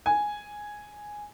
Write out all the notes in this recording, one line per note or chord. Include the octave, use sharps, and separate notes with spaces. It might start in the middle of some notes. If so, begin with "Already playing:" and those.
G#5